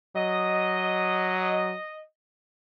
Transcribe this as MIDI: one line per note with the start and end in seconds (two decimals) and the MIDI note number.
0.16 1.74 54
0.16 2.01 75